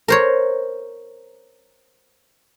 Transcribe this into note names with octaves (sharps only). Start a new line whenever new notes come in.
A#4 C5 C#5